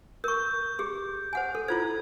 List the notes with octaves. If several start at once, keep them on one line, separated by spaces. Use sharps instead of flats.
A#4 C#6 G6
G4 G#4
C5 F#5 G#5
A4
E4 F4 C5 G#6